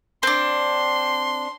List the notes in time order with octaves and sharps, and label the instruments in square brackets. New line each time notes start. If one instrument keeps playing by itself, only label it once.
[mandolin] C4 D4 [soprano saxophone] C6